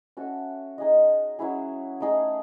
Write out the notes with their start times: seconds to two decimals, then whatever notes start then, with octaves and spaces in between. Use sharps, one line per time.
0.17 C#4 F#4 A4 E5
0.78 D#4 G#4 D#5
1.39 F#3 C#4 E4 G#4
2.00 A3 D#4 G#4